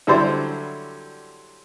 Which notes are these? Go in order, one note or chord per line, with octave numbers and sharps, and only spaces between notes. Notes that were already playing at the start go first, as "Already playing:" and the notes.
D3 F#3 G3 E4 C5 D5